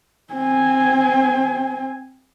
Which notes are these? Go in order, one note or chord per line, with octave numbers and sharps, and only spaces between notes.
C4 G#5